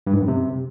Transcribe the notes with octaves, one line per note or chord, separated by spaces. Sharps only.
G2
G#2
F#2
C3